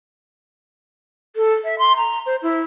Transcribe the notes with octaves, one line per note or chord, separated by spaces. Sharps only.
A4
E5
C6
A#5
C5
E4